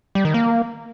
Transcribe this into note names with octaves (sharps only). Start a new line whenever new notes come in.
G3
D#3
A#3